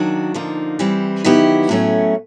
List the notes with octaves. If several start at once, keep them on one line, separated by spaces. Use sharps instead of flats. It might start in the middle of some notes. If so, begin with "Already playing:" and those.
Already playing: D#3 F#3 A#3 D4 F#4
D3 F3 A#3 D#4
E3 G3 C4
D#3 F#3 B3 E4 G4
A2 F#3 A3 C#4